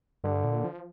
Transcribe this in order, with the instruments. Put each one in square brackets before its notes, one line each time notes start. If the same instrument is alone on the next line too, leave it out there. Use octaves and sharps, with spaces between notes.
[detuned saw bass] G2 [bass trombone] D3
[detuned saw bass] A#2
F3